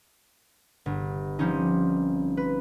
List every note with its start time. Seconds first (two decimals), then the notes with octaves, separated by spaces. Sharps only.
0.86 G1
1.39 F3 G3 C4 C#4 D#4
2.37 B4